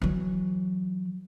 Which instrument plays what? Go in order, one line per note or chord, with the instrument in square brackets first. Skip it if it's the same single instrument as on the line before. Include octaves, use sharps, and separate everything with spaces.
[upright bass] E3 F#3